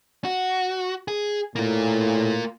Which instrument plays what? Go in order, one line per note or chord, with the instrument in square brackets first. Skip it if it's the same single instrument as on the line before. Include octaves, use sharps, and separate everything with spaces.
[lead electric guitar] F#4
G#4
[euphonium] A2 [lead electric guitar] A#3 F4